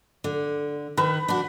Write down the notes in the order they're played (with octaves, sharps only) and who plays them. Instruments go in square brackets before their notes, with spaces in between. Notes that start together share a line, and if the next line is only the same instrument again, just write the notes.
[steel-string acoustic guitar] D3
[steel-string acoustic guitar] D#3 [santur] B4
[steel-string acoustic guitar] D4 F#4